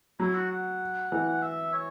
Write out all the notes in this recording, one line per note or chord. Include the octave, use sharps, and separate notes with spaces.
F#3 E4
F#4
F#5
E3
F#5
E5
C#5